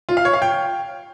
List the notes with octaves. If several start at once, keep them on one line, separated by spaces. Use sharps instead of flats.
F4
F5
C#5
F5
G5